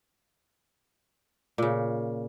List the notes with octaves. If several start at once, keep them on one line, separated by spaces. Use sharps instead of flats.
A#2 C#3